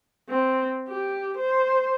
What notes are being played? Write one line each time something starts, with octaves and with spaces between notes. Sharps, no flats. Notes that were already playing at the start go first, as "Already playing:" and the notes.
C4
G4
C5